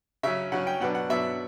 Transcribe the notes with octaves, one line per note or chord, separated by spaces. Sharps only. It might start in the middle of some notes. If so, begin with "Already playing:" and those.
C#3 F#3 C#4 E5
C#3 F#3 C#4 F#5
G5
B2 F#3 B3 D4 F#5
F#5
B2 F#3 B3 D4 E5